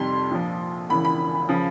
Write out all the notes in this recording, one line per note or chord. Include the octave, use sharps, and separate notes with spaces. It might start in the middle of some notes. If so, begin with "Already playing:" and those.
Already playing: F2 C3 D#3 G3 C6
A#1 A#2 F3
E1 E2 C#3 E3 B5
B5
C#3 F3